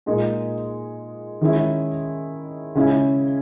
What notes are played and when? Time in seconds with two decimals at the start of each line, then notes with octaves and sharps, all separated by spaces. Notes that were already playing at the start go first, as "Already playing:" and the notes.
0.06 A#2 G#3 D#4
1.41 D#3 G#3 C#4 E4
2.75 C#3 G#3 C#4 E4